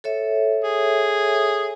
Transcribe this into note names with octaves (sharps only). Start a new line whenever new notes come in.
A4 C#5 E5
G#4